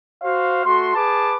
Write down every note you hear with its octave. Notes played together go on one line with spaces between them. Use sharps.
F#4 C5 F5
A3 F#4 C6
G#4 B4 A5 D6